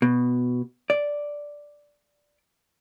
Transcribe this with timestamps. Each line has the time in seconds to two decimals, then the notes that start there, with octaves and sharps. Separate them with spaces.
0.02 B2
0.90 D5